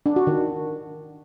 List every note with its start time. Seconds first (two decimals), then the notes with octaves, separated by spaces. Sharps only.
0.06 D4
0.16 F#4
0.27 D#3